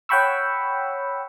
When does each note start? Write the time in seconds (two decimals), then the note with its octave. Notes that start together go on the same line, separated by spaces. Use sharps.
0.09 C#5 F#5 G5 B5 C#6 E6